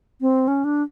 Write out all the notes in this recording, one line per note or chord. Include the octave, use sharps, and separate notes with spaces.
C4
C#4
D4